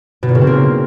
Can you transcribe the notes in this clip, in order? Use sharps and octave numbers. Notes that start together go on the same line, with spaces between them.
B2
A#2
C#3
C4
A#3